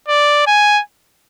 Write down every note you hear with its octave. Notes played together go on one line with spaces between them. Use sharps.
D5
G#5